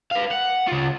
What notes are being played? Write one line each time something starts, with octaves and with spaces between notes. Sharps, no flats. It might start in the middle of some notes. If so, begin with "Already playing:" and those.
B4 F5
F#5
C#3 F4